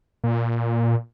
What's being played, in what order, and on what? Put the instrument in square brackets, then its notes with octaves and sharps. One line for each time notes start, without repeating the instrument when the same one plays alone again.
[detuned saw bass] A#2